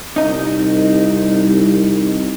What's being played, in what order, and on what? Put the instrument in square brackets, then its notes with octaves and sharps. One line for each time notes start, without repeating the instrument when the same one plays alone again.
[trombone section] C2 [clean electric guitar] D#4 D#5